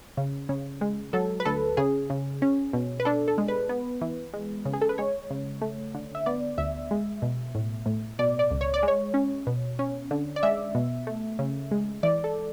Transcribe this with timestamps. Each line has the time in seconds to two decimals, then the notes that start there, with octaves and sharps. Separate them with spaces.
0.17 C#3
0.49 C#3
0.81 G#3
1.13 F#3 A4
1.40 B4
1.45 D2 A4
1.77 C#3 G#4
2.10 C#3
2.42 C#4
2.73 B2
3.00 B4
3.05 D4 A4
3.28 A4
3.38 G#3
3.48 B4
3.69 B3
4.01 E3
4.34 G#3
4.65 C#3
4.73 G#4
4.81 A4
4.89 B4
4.98 G#3 C#5
5.31 C#3
5.61 A3
5.94 D3
6.15 E5
6.26 B3 D5
6.58 D2 E5
6.91 G#3
7.22 B2
7.55 A2
7.86 A2
8.19 B2 D5
8.39 D5
8.51 C#2
8.61 C#5
8.74 D5
8.83 G#3
8.88 C#5
9.14 C#4
9.47 B2
9.79 C#4
10.11 D3
10.36 D5
10.43 G#3 E5
10.75 B2
11.07 A3
11.39 C#3
11.71 G#3
12.03 E3 D5
12.24 A4